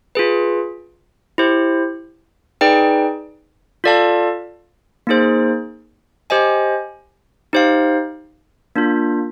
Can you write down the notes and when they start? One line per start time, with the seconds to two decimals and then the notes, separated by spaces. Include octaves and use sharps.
0.15 F4 G#4 B4
1.38 E4 G4 C5
2.61 D#4 G#4 B4 D5 G5
3.84 F4 A4 D5 F5 A5
5.07 A#3 D#4 G#4 C5
6.30 G4 C5 D#5 G#5
7.53 D#4 G4 C5 F5
8.76 A#3 D4 F4